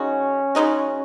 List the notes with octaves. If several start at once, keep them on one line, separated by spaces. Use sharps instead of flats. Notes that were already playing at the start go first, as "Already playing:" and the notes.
Already playing: C#3 G#3 C#4 D#4 F#4
C#3 G#3 D#4 F#4